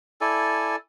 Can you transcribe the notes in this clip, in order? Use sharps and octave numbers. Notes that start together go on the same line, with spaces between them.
E4 A4 D5 G#5